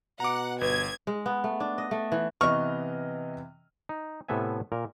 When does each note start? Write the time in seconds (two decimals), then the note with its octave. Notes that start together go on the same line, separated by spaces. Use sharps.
0.20 B2 F#5 A#5 D6
0.61 G1 B4 G#6
1.07 G#3
1.26 B3
1.44 A3
1.60 D4
1.78 D#5
1.91 A3
2.12 E3
2.41 C3 E3 B3 D#5 C#6 F6
3.89 D#4
4.28 A2 C3 B3 A4 E5 G#5
4.72 A#2 A#4